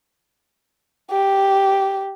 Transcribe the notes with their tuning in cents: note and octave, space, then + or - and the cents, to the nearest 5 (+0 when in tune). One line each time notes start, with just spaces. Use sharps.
G4 -5